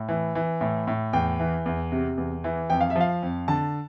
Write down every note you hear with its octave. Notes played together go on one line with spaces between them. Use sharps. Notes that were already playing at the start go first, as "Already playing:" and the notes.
Already playing: A2
E3
E3
A2
A2
E2 G5
E3
E2
C3
E2
E3
F2 G5
F5
E5
F3
F5
F2
D3 A5